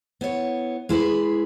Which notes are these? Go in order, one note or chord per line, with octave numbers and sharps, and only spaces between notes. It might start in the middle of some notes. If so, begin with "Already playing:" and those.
B3 E4 C#5
G#3 E4 G#4 B4